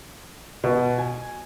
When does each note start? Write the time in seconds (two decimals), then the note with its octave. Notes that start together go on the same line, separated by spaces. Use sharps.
0.64 B2
0.98 G#5